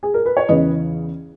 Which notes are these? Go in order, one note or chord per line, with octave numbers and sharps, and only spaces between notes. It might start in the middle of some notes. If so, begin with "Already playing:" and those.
G#4
A#4
B4
C#5
E2 C#3 E3 B4 D#5